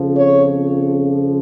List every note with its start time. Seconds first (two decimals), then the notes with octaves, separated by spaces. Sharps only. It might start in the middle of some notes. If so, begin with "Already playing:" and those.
Already playing: F2 C#3 F3
0.17 C#5